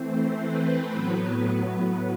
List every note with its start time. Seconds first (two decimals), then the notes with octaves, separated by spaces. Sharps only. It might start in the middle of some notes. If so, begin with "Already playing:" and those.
Already playing: E3 A3 C4 C5
0.39 B4
0.93 A2 F#3 B3